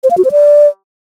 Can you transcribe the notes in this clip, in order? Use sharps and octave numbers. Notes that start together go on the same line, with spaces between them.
C5
F5
F#4
C5
D5